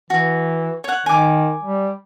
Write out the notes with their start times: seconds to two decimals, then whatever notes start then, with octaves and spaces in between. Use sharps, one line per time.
0.10 E3 F#4
0.84 C#5 F#5
1.06 D#3 G#5 D6
1.63 G3